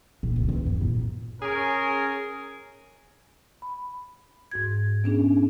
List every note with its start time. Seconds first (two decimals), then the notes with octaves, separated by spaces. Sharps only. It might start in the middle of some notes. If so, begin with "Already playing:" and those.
0.23 A#2
0.36 C#2
0.49 E3 F3
0.65 F#2 B3
0.81 A#2 D#4
1.40 C#4 G#4 A#4
3.62 B5
4.51 G#2 F#4 G#6
5.04 B3 C#4 D4 G#4